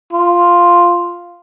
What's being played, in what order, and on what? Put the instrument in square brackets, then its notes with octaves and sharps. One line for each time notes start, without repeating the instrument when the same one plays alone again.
[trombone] F4